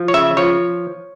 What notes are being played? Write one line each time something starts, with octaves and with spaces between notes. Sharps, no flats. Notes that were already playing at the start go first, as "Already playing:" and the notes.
Already playing: F3
C#5
C#3 E5
F3 C#5